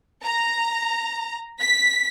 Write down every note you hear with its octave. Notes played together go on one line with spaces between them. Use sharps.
A#5
B6